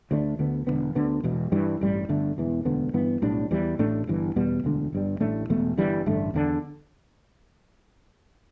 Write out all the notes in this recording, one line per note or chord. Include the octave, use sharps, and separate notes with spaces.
D2 D3 A3 D4
D2 D3 B3
E1 E2 D3 B3
D2 D3 B3
E1 E2 B2
G2 E3 G3
A1 G2 G3
G1 G2 D3 A3
E1 E2 E3
E1 D2 D3 B3
G2 E3 B3
B1 A2 G3 D4
E2 E3 G3
A1 A2 A3 D4
G1 G2 E3
E2 B2 G3 B3
E1 D2 D3
G1 G2 G3
A1 A2 A3 D4
E1 E2 B2 A3
G1 G2 E3 G3
A1 G2 D3 A3
E2 D3 A3 D4